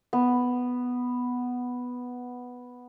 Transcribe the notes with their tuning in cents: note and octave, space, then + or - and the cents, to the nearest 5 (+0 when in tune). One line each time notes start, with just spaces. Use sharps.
B3 +0